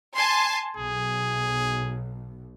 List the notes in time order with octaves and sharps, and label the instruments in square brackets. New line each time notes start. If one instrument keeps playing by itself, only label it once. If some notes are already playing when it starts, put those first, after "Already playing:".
[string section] G#5 A5 C6
[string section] B1 [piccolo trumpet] G#4